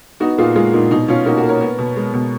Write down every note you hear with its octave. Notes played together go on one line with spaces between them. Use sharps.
B3 D#4 F#4
A#2 F4 G#4
G#3 F4 G#4
A#2 D#4
B2 D#4
B2 C#4 F4
A#3 D#4 F#4
F#4 A#4
A#3
A#4 C#5
B3
B2
G#3
B2